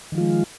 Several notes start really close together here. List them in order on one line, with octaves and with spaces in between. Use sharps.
D#3 F3 F4 G#3